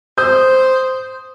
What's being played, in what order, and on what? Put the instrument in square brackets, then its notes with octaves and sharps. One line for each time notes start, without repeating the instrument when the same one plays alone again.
[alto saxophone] C5 [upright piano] D#6 G6